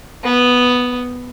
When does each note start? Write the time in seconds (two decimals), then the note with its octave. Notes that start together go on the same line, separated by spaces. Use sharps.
0.24 B3